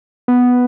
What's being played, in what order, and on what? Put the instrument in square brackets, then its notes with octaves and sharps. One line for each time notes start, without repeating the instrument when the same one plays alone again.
[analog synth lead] B3